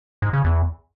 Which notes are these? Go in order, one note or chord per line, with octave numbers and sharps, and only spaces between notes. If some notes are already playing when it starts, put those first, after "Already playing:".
G#2
C#3
E2